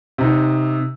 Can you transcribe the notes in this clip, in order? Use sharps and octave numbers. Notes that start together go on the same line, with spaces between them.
C3 D#4